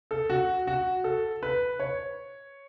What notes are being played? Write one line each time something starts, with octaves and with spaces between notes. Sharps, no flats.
A4
F#4
F#4
A4
B4
C#5